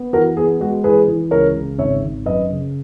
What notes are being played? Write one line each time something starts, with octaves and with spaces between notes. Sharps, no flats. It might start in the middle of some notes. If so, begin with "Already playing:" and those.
Already playing: B3
E3 F#4 A#4
B3 G#4
G#3 F#4
E3 G#4 B4
E3
C#2 A#4 C#5
C#3
G#1 C#5 E5
G#1
F#2 B4 D#5
C#3